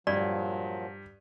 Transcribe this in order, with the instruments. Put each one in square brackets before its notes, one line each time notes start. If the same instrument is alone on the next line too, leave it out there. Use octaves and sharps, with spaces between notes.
[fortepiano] G2 [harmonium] A#2 F3 F#3 [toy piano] D5